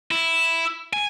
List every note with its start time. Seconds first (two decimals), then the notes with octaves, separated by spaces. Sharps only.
0.11 E4
0.93 G#5